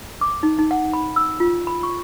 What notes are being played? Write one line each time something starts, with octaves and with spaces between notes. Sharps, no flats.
D6
D#4
D#4
F#5
B5
E6
F4
B5
C#6